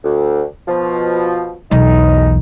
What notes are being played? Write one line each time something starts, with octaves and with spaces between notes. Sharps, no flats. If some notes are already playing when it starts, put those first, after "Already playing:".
D2
B2 F3
B1 E2 D#4